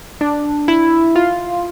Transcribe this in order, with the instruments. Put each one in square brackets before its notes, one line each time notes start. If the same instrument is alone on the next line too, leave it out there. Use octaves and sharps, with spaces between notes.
[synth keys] D4
E4
F4